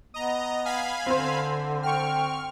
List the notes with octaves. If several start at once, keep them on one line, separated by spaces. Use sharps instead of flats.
B3 D#5 A#5
F5 G#5 B5
D3 C4 C5
G5 C#6 F6